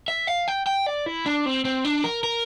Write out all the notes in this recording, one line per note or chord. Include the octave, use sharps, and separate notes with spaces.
E5
F5
G5
G5
D5
E4
D4
C4
C4
D4
A#4
A#4